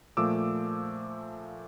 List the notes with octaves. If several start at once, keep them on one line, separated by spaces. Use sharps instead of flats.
A#2 F3 A3 D6 E6